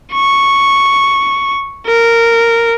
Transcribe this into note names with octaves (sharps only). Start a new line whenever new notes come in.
C#6
A#4